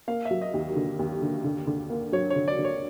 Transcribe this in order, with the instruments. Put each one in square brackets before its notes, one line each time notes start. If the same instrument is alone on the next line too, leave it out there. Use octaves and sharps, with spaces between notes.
[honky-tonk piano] A#3 [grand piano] F5
[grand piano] E5
[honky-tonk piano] F#3
[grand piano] D#5
[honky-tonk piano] D#2
D3
D#2
D3
D3
D3
A#3
[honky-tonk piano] F#3 [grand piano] C#5
[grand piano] C#5
[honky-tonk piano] D3
[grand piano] D5
[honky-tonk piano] D3
[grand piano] C#5